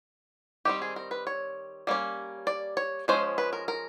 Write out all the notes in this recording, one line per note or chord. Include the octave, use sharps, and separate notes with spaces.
D#3 G3 C4 G4
G#4
A#4
B4
C#5
G3 A#3 C#4
D5
C#5
F3 G#3 C#4 C5
B4
A#4
A#4